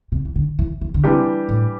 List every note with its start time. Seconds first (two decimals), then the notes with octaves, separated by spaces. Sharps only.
0.12 C3
0.25 E3
0.36 D3
0.59 E3
0.81 E3
0.94 D3
1.04 C3 E3 G3 D4 G4
1.49 A2